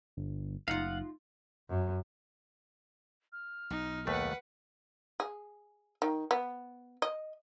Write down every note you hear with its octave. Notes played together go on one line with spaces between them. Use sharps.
G1
F#1 D#4 F4 F5 F#5
F#2
F6
B1 D#4
D#2 A3 B4 F#5
G#4
D#3
B3
D#5